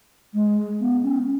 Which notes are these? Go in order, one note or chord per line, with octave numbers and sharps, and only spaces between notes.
G#3
B3
C#4